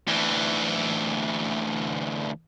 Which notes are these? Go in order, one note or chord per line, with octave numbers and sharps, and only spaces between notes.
D2 E3